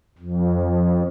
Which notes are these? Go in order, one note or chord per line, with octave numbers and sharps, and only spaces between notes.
F2